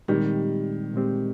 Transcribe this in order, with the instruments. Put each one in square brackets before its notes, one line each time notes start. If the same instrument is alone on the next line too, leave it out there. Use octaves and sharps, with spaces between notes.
[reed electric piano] A#2 G#3 C4 G4 [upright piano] D#3 G3
[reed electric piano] A#2 G#3 C4 G4